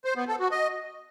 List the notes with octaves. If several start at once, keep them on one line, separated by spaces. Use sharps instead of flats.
C5
B3
A4
F#4
D#5